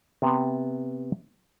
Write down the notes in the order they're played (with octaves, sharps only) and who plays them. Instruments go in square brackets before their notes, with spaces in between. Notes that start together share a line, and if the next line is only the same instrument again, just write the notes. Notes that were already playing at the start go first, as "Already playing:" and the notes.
[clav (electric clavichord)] C3 B3